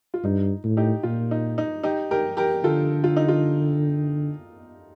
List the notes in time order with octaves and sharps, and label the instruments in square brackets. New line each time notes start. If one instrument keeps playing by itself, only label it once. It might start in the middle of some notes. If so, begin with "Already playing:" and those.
[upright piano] F4
[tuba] G2 [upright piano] D#4
[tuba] A2
[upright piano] D#4 G4
[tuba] A#2 [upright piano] F4
[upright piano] D#4
D#4
D#4 G4
G4 A#4
G4 A#4
[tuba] D3 [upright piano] F4 A4
[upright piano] F4
D#4
F4